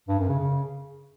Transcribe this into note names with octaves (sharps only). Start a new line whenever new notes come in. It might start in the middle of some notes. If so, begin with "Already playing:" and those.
G2
F#2
C#3
C#3